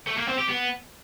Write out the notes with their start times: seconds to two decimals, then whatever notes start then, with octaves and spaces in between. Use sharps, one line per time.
0.07 A3
0.17 A#3
0.28 C4
0.38 G4
0.49 B3